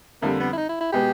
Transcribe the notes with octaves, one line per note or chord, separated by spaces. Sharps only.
F2 D3 G3 A#3
B3
E4
D#4
E4
E4
B2 G#3 B3 G4